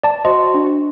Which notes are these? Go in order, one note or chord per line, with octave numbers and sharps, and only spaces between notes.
D5 A5
F#4 C5 D#5 C6
D4